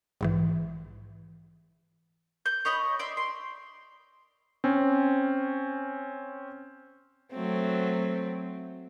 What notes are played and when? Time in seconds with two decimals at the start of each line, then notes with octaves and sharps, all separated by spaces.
0.21 A#1 G#2 E3
2.46 G6
2.65 C#5 D#5 B5 C#6
2.99 D5 E5 C6
3.17 C6
4.64 C4 C#4
7.33 F#3 A3 C4